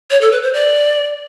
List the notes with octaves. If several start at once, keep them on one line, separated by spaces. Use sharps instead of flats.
C#5
A4
B4
C5
D5